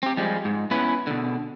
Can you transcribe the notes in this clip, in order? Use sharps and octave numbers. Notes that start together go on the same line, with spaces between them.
C4 G4
F3 G3 G#3
G#2
B3 C#4 E4 B4
B2 D3